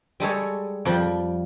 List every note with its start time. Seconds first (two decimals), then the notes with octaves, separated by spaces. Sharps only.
0.20 G3 G#3 A4 C#5
0.85 F2 F3 G3